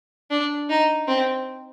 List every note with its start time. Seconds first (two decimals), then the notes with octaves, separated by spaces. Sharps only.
0.31 D4
0.70 D#4
1.08 C4